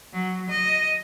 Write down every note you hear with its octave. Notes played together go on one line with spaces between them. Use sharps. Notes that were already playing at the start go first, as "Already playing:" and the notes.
F#3
D#5